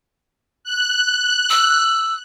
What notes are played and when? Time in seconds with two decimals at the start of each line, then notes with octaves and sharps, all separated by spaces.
0.64 F#6
1.50 E6